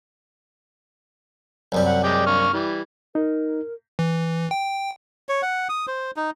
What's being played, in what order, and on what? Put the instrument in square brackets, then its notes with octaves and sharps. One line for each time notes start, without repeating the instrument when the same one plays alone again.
[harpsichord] C2 F#2 G3
[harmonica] F#5
G#3 D5 G5
A#3 C#6 F6
E3 G3
[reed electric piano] D#4 [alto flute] A#4
[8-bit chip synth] E3
G5
[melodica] C#5
F#5
D#6
C5
D#4